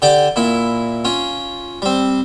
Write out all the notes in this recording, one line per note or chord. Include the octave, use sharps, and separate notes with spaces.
D3 G4 D5 D6
A#2 E4
C#4 F4
G3 C4